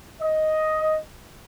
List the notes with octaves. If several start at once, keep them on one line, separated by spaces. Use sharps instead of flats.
D#5